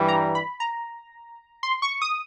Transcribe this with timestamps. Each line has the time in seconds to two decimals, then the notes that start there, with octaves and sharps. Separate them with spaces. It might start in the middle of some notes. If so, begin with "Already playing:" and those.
Already playing: G2 E3 G3
0.08 A#5
0.35 B5
0.60 A#5
1.63 C6
1.82 C#6
2.02 D#6